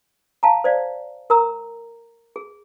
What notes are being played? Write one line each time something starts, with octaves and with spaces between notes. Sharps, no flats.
F5 A5 A#5
C5 D5 F5
A#4 A#5 E6
G#4